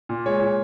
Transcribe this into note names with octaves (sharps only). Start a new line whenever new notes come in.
A#2
G#3 C#5
A#2